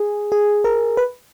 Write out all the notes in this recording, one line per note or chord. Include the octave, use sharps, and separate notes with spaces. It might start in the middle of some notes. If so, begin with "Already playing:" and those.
Already playing: G#4
G#4
A#4
B4